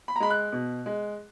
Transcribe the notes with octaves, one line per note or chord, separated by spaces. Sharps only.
B5
A#5
G#3 B5
F#6
B2
G#3